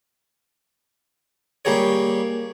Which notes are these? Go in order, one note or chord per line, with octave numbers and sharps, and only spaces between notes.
G3 A#3 G4 G#4 C#5